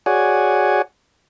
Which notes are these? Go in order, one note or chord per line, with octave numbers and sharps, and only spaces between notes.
F#4 G#4 C#5 D5 F#5 G#5